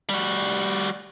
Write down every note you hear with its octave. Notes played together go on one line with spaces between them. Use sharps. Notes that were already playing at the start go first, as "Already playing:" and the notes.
G3 F#4